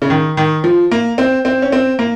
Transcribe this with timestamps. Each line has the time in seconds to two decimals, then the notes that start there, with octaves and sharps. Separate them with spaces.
0.02 C#3
0.10 D#3
0.37 D#3
0.64 F3
0.91 A#3
1.18 C4
1.45 C4
1.62 C#4
1.72 C4
1.99 A#3